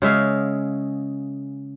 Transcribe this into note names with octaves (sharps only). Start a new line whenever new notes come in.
C#3 G#3 E5 F5